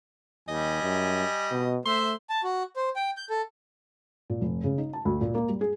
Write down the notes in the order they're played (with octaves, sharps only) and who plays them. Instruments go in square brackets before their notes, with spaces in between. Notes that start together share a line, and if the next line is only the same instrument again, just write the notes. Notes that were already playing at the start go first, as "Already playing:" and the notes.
[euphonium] D#2 [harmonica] G3 G#5 [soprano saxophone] D#5
[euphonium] F#2
B2
[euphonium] A3 [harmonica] C5 E5 [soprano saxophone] C6
[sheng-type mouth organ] A5
F#4
C5
G5
G6
A4
[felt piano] A#2
F1
C#3
D#4
A5
D2
A#2
A#3
G3
G#4